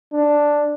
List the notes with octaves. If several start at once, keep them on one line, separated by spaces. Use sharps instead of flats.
D4